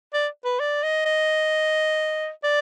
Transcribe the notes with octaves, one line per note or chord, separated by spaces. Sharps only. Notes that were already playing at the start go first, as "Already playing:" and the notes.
D5
B4
D5
D#5
D#5
D5